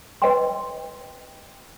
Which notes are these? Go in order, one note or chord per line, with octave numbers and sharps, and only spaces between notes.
B4 D#5 G5 C6